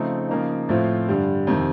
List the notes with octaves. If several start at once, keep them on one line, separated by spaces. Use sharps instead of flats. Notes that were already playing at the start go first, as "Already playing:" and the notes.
Already playing: C#3 F3 A3 C4 D#4
C#3 F3 A#3 D#4
A2 F3 A3 C4 F4
G2 D3 G3
F2 C3 D#3